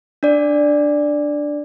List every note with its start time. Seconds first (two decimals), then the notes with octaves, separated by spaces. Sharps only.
0.23 D4 D5